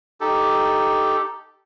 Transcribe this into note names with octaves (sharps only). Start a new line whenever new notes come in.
D#4 G4 A4